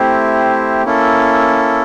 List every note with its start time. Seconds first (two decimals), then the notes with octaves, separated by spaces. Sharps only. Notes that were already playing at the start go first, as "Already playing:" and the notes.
Already playing: A3 C4 E4 G4 C5
0.84 A#3 C#4 E4 A4